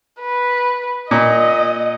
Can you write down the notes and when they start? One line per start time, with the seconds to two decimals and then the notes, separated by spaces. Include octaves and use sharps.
0.21 B4
1.11 A#2 D#5